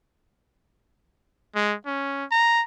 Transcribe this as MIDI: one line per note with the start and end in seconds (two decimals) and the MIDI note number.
1.55 1.75 56
1.86 2.25 61
2.31 2.63 82